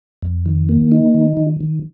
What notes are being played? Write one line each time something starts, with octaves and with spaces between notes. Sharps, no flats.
F2
D#3
A#3
D#4
D#3
D#3
D#3